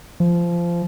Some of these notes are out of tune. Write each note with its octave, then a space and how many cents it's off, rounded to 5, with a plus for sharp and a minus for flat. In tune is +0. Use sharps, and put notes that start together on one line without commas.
F3 -20